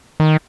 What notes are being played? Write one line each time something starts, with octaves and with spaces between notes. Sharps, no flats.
D#3